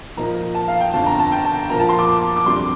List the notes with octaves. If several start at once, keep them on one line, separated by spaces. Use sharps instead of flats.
A#2 F3 A#3 D#4 A#5
A5
F5
G5
G1 F2 D3 A5
A#5
A5
G5
A5
A#2 F3 A#3 A#5
A5
C6
D6
D6
F2 C3 G3 D4 C6